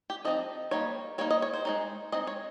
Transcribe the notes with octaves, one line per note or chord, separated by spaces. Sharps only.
G4
F3 C4 D#4 D#5
G3 A#3 D#4 C#5
G3 A#3 D#4 C#5
D#5
C#5
C5
G#3 C4 D#4
G#3 C4 D#4 D#5
C#5